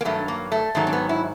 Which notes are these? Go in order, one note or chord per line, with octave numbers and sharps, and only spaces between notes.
A#3
G2 D#3 F#3 A3
A#3
A3
G#2 D#3 F#3 A3
C4
B3
E4